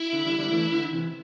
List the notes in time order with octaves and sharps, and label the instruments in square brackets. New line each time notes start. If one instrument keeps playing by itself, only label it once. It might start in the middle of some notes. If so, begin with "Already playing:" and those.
Already playing: [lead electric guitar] E4
[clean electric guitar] D3
D3 G3
D3 G3
E3 A3
D3
C3 E3